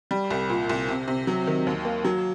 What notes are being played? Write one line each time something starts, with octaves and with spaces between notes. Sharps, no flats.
G3
C2
A#2
C2
C3
C3
F#3
D#3
D#2
A#3
F#3